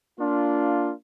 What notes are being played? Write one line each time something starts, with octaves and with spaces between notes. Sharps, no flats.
A#3 D4 F4